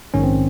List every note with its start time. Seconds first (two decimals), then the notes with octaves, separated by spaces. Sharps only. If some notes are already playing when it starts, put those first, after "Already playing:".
0.14 A#1 G#2 D#3 C#4
0.23 C4